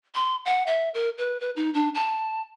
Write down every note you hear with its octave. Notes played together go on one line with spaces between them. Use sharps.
C6
F#5
E5
A#4
B4
B4
D#4
D4
A5